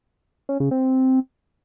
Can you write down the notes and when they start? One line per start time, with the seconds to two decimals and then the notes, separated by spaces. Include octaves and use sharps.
0.49 C#4
0.60 C#3
0.71 C4